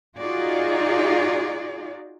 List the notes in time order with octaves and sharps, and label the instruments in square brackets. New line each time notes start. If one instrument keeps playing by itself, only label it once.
[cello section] D#4 F4 F#4 G#4 D5